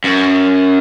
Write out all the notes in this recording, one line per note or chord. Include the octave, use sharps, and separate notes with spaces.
F#2